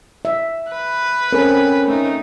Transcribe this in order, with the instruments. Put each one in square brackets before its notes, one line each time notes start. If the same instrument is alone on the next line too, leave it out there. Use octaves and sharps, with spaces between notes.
[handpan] E5
[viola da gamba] B4
[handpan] C4 [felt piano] C#4 A4 A#4
[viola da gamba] A3 D#4